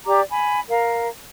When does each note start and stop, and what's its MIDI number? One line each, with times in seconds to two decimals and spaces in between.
0.06 0.21 67
0.06 0.21 74
0.06 0.21 82
0.06 0.21 86
0.30 0.60 80
0.30 0.60 83
0.69 1.08 70
0.69 1.08 77